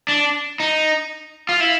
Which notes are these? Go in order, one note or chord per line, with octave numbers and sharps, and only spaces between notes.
D4
D#4
F4
E4